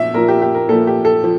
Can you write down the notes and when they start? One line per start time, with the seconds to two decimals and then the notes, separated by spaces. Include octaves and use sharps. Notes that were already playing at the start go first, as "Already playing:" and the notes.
Already playing: A#2 F3 E5
0.14 A#2 F3 A#4
0.28 G4
0.42 G4
0.54 A#4
0.68 A#2 F3 A4
0.87 G4
1.05 A4
1.23 F3